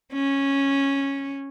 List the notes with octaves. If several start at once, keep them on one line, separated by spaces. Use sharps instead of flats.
C#4